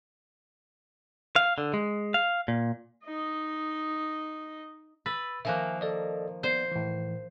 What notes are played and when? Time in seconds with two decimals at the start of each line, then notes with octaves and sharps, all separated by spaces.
1.36 F5
1.58 D3
1.74 G#3
2.14 F5
2.48 A#2
3.05 D#4 D#5
5.06 B4 B5 E6 A6
5.45 D#3 F3 A#3 E5 G#5 F#6
5.81 A4 D5 D#5
6.43 B3 C5 D5 C7
6.72 A2 E3